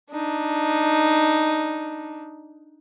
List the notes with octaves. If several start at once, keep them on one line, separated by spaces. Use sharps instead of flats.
D4 D#4